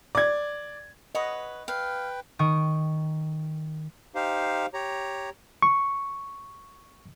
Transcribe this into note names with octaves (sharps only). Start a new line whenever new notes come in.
D5 G#6
B4 C#5 D#5 F#5
B4 F5 G5
D#3 G5 C#6 D#6
D#4 G4 C5 F5
G4 C#5 A#5
C#6